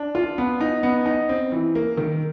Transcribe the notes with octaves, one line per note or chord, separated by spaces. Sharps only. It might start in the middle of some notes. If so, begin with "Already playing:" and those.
Already playing: D4
F4
B3
D#4
B3
D#4
C4
E3
A#3
D#3